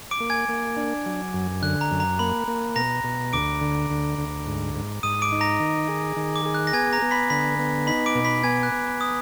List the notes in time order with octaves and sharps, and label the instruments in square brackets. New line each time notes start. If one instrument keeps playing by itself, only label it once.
[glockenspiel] D6 D7
[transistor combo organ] A#3
[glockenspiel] G#5 G#6
[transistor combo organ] A#3
D4
F#3
F#2
[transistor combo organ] D3 [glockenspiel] F#6
[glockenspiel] A#5
[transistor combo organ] F#2
[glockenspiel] A#5
[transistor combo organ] A#3 [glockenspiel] B5
[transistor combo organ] A#3
[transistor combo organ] B2 [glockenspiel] A#5 A#6
[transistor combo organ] B2
[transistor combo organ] D2 [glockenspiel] D6 D7
[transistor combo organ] D3
D2
D2
G#2
G#2
[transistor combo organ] G#2 [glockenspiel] D#6 D#7
[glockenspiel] D6 D7
[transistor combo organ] D#4
[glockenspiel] A#5 A#6
[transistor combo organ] D#3
G#4
D#3
[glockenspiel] D6
[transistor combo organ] G#4
[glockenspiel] F#6
A#6
[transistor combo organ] B3 [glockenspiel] G#5 G#6
[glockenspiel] A#5 A#6
[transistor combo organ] B3
[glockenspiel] B5 B6
[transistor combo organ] D3 [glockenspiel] B5 B6
[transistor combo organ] B3
[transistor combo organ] D#4 [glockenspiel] B5 B6
[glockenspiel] D6 D7
[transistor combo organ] B2
[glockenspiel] B5 B6
[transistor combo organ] B3 [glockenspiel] G#5 G#6
[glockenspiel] F#6
[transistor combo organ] B3
[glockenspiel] D#6